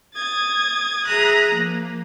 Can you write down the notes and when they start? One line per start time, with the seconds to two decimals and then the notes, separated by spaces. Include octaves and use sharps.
0.15 D#6 G#6 A6
1.05 G#4 E5 A#5 D#6 F#6
1.52 F3 A#3